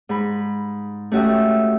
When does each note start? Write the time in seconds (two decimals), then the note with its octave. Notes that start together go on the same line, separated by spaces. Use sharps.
0.09 G#2 B5
1.12 A3 C#4 F#4 G4 D#5 E5